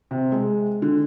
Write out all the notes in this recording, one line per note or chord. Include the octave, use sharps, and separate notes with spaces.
C3
G#3
D3